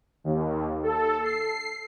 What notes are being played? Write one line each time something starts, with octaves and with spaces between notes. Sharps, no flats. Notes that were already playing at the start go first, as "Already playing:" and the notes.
D#2
A4
C7